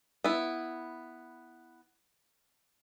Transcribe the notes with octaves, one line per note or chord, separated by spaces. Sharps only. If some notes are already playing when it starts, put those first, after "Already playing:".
B3 E4